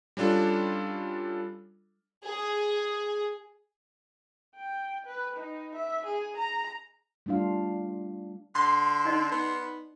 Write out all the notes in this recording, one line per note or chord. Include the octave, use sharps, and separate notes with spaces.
G3 C#4 D4 F4 A4
G#4
G5
B4
D#4
E5
G#4
A#5
G3 A3 D4 F4 F5
D3 C6
D#4 D5 D#5
B3